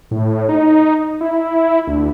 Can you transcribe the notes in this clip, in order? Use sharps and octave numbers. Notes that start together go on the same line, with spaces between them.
A2
D#4
E4
D2